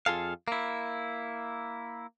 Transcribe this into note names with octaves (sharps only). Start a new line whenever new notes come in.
F2 F4 G#4 A4 F5
A#3 E4